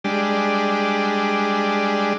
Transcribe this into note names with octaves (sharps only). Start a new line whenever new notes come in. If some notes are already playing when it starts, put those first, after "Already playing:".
G3 G#3 D4